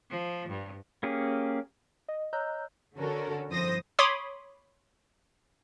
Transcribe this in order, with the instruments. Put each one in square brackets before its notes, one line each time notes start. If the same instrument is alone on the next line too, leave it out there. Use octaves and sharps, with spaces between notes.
[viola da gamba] F3
G2
[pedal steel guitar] A#3 C#4 G4 G#4
[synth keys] D#5
C#5 D#5 A#5 E6 F#6 G6
[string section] D3 C#4 F#4 A4 A#4
G1 F2 E4 C5 D#6 A#6
[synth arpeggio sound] C#5 B5 C6 D6 D#6